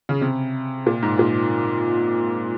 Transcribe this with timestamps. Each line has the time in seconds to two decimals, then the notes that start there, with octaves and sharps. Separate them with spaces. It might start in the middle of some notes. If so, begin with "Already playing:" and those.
0.09 C#3
0.22 C3
0.86 A#2
1.03 G#2
1.19 A#2